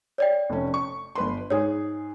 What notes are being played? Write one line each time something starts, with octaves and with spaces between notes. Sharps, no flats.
C#5 D5 G5
F1 C#4
C#6
G1 B4 C6
G#2 G#4 C#5